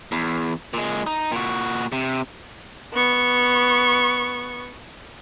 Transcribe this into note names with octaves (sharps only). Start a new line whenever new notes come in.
E2
A#2 G#3
D#4
A#2 F#4
C3
B3 C#6